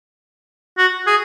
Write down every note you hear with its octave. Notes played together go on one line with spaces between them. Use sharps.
F#4
G#4